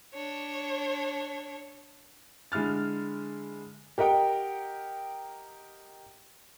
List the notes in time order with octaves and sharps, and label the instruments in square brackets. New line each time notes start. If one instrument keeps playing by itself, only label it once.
[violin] D4 C#5
[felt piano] D3 G#3 E4 F6 A6
[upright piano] G4 A#4 D#5 F#5 G5